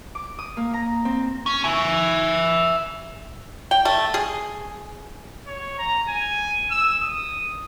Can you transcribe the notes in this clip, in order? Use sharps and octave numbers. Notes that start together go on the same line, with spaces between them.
D6
D#6
A#3
A#5
C4
C#4
E5 G#5
G5
A3
G#4
C#5
A#5
G#5
E6
D#6